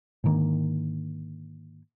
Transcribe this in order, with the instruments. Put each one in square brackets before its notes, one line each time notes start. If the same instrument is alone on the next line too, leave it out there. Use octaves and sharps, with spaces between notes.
[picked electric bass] G#2 D3 D#3 A#3